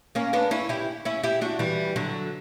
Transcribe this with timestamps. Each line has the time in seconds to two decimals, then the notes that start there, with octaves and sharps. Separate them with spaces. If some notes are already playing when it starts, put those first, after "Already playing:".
0.15 A#3 C#4
0.33 B3 D4
0.51 C#4 E4
0.69 E4 G4
1.05 C#4 E4
1.24 E4 G4
1.41 D4 F#4
1.59 E3 G3
1.96 D3 F#3